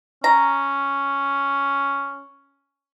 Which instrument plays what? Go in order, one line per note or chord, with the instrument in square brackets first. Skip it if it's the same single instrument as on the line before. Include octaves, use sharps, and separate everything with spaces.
[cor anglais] C#4 [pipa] A#5